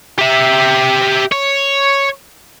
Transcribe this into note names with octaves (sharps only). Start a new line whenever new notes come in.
G4 E5
C#5